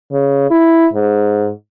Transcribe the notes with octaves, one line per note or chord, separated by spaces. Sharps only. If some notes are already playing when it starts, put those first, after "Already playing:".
C#3
E4
G#2